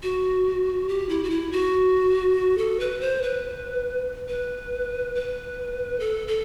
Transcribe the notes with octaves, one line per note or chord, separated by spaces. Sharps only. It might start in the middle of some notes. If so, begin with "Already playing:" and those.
F#4
G4
E4
F#4
E4
F#4
A4
B4
C5
B4
B4
B4
A4
A4